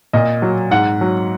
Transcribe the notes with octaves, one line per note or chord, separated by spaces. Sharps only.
A#2 D#5
F#3
G#2 F#5
F#3